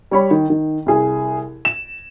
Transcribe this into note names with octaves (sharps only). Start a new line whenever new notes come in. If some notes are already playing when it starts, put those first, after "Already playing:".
G3 C#5 B5
D#3
D#3
C2 G#4
E7